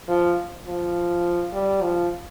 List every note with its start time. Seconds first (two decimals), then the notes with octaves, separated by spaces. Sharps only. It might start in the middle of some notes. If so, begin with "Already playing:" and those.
0.08 F3
0.67 F3
1.53 G3
1.82 F3